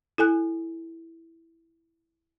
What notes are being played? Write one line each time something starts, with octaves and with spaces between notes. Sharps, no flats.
E4 A4 G#5 F#6